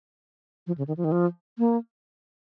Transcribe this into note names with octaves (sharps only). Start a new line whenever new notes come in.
F3
C#3
D#3
F3
D#3
F3
A#3